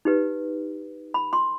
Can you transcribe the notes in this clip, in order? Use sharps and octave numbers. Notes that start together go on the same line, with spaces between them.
D#4 G4 B4
B5
C6